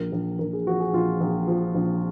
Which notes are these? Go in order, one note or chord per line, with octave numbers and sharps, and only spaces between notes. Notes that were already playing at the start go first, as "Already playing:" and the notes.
Already playing: A#1 A#4
A#1
A#1 A#4
G#4
F3 F#4
G#4
A#1 F4
A#1
F3
A#1